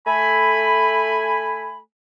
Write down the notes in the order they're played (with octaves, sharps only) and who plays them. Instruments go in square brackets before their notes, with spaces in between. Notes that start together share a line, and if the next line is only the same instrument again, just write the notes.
[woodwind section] A3 G#5 B5